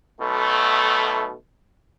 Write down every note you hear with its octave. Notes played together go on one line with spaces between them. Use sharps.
B1 B2 A3